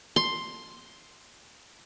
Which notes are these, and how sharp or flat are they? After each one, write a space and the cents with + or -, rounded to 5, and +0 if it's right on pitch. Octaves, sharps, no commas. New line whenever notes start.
C6 +5